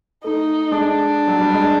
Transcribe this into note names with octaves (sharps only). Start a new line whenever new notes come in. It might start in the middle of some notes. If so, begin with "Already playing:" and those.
A3 D#4
G#3 D4
F#3
G3
G#3